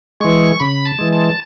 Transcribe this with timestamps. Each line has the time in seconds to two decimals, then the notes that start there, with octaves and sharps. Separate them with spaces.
0.21 E3 G#3 C#6
0.60 C#3 B5
0.85 A5
0.99 E3 G#3
1.13 A5